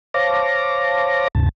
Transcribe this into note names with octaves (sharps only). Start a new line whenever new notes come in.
C5 C#5 F5 A5 D6 A#6
D2 G2 C3 A5